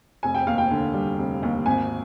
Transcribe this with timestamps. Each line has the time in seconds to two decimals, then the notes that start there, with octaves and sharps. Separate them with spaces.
0.23 F1 G#5
0.34 G5
0.47 D#2 F5
0.58 G5
0.71 D3
0.94 G3
1.18 F1
1.43 D#2
1.66 G#1 G#5